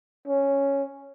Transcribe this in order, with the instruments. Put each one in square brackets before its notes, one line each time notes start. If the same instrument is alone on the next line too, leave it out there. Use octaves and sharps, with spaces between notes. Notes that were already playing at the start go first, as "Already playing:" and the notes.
[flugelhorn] C#4